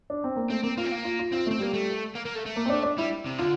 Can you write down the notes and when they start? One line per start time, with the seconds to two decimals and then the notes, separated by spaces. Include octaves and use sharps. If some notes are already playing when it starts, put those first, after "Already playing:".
0.10 D4
0.24 C4
0.36 A#3
0.50 A3 C4
0.63 A#3 C4
0.77 A#3 F4
0.85 C4
0.92 A#3
1.05 F4
1.19 F4
1.32 C4 F4
1.47 A3
1.51 C4
1.60 G3 A#3
1.74 A3
2.15 A#3
2.25 A#3
2.35 A3
2.46 A3
2.56 A#3
2.66 C4
2.69 D4
2.83 D4
2.98 G3 E4
3.25 C3
3.38 D3 F4